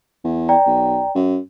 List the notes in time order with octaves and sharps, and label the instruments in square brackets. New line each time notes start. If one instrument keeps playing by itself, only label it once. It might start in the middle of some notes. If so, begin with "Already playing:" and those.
[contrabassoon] E2
[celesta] D5 G5 A#5
[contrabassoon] B1
F#2